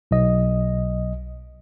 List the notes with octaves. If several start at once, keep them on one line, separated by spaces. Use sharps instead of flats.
B1 D#5